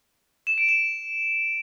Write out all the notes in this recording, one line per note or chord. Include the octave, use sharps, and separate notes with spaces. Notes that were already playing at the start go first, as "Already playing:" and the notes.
E7
D7
E7